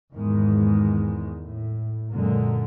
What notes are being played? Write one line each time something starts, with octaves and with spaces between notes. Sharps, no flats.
E2 G#2 D#3 G#3
A2
F#2 A#2 D3 G#3 A#3